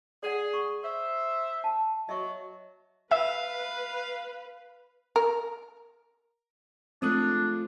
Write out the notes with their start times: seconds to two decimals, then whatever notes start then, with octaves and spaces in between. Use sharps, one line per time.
0.23 G#4 D5 F#5
0.53 C#6
0.83 C5 E5
1.64 A5
2.09 F#3 D#5 E5 C#6
3.11 B4 E5 F5
5.16 A#4
7.02 F3 G#3 A3 C4 D4 D#6 F#6